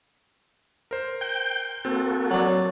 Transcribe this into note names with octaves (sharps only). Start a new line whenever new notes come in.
A#4 C5
G5 G6
A#3 C4 F#4 A4
F#3 D4